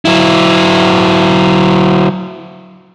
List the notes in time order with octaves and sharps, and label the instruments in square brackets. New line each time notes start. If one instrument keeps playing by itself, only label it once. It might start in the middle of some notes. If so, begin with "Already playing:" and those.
[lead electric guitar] F#3 E4